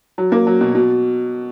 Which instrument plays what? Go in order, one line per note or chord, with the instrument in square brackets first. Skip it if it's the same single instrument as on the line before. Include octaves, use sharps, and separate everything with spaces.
[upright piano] F#3
A#3
F#3
B2
B2